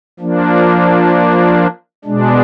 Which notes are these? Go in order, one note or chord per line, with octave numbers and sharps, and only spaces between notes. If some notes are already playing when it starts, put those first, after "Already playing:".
F3 A#3 D4
B2 G#3 D4